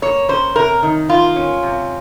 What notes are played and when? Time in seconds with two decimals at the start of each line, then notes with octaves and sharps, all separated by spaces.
0.02 A#3 C#5
0.29 C#4 C5
0.56 C3 A#4
0.83 D#3
1.09 A#3 F4
1.36 C#4
1.63 C3